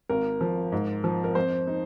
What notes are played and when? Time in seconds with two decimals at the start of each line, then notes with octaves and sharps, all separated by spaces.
0.09 G#1 A#4
0.41 F3
0.72 G#2
1.04 F3
1.24 A#4
1.35 F2 C5
1.67 D#4